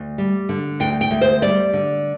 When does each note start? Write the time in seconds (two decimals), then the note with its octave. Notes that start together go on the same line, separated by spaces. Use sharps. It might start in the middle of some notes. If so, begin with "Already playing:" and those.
Already playing: D2
0.18 G3
0.49 D3
0.80 D2 G5
1.01 G5
1.11 D2
1.21 C5
1.42 G3 D5
1.73 D3